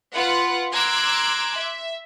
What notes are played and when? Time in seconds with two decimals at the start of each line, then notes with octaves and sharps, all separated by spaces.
0.13 F4 B4 F#5
0.73 A#5 C6 D6 E6 F#6 G#6
1.57 E5